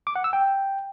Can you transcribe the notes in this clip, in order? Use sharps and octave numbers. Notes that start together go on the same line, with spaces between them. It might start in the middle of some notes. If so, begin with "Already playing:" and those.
D6
F#5
E6
G5